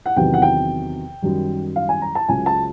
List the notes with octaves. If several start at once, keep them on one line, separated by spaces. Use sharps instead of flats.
F#5
E2 C3 D#3 F#3 G5
F#5
G5
F#2 D#3 G3
F5
G#5
A#5
A5
C#2 C#3 F#3 G#5
A5